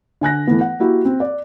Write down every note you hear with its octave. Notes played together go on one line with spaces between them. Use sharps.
D3 G#5 F#6 A#6
E3 A3 B3
F#5
A#3 E4 F#4 G4
C4
D5